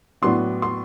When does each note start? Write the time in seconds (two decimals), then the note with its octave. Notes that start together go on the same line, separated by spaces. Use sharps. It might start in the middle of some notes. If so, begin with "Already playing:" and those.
0.22 A2 F#3 B3 D4 C6
0.62 C6